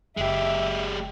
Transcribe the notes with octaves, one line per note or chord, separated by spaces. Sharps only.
F#1 G#3 G4 E5